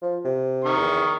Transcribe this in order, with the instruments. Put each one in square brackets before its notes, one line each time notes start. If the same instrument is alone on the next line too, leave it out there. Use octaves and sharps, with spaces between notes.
[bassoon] F3
C3
[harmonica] D#3 C#6
[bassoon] E2